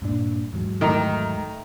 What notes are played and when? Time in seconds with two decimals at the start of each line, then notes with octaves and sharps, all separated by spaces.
0.02 G2 A#2 D4
0.53 E2 G#2 F#3
0.81 D#3 A3 D#4 A#5